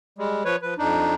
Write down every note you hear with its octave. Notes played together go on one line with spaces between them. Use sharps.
G3 G#3
F3 B4 C#5
F3 B4
F2 D4 D#4